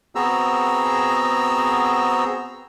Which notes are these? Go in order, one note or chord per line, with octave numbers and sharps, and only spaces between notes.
B3 C4 F#4 G#4 A#5 E6